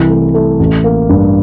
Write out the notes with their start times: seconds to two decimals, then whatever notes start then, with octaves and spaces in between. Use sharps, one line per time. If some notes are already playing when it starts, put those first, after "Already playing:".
Already playing: C2 E3
0.09 A3
0.34 A3
0.59 A1
0.84 A#3
1.09 G2